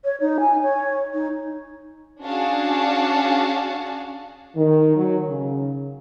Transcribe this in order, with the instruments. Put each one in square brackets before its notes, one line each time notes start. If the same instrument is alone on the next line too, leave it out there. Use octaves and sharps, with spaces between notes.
[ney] C#5
D#4
G#5
C#5
D#4
[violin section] C#4 D4 F#4 G#4 F5 A5
[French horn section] D#3
F#3
C#3